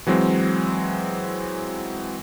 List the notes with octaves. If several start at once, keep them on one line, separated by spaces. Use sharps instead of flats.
E3 F#3 G#3 C4